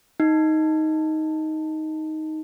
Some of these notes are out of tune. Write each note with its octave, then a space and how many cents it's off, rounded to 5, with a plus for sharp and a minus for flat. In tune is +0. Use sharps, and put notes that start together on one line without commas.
D#4 +10